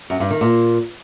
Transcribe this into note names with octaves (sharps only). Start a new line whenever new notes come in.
F#2
G2
D#3
A#2